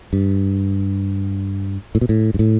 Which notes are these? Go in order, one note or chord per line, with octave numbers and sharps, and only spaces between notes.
G2
A2
B2
A2
G2
A2